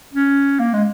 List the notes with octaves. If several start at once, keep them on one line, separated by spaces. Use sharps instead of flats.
C#4
A#3
G#3